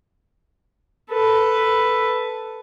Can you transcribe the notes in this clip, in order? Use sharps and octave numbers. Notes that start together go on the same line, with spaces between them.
A4 B4